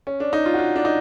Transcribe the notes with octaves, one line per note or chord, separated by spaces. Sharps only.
C#4
D4
D#4
F4
F#4
F4
D4
D#4